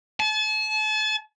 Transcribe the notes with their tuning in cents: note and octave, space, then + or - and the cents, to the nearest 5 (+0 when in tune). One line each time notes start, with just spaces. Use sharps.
A5 -40